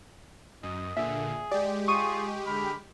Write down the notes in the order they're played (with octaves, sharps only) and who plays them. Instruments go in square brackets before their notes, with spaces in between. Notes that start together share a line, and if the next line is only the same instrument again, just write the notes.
[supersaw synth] F#2 [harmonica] D#5
[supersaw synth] A#2 D3 [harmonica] G#4 [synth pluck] E5
[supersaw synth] G#3 G4 [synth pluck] D5
[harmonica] F4 G#4 [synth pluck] C#6 D#6 D#7
[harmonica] D3 B5 F6